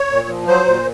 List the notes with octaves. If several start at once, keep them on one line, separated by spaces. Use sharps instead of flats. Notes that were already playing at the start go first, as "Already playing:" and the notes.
Already playing: C#5
A#2
F3
F#3 C5
A#2